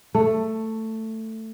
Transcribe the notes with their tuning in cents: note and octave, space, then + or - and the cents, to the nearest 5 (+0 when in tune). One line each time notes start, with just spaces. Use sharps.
A3 +10